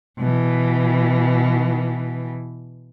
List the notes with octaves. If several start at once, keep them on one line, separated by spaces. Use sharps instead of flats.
B2 E3